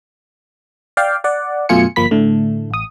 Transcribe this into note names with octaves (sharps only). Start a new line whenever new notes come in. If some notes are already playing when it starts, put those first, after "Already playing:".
D5 F5 G5
D5 F#5
F#2 B2 A3 F4 G#5 C#7
G1 F3 A#3 B5 B6
A2 D3 A3
A1 D#6